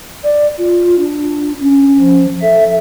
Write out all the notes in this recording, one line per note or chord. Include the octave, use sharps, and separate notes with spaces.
D5
F4
D4
C#4
F3
A4 E5